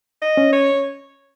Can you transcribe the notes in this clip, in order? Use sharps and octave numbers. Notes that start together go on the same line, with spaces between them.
D#5
C#4
C#5